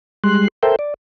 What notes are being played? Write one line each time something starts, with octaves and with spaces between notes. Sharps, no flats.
G3 G#3 C6 F#6
A4 A#4 C5 E5 G5
D5